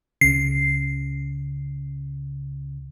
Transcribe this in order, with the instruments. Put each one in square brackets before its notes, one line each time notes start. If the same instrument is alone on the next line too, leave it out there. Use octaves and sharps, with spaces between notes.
[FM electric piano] C#2 C#3 [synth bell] C7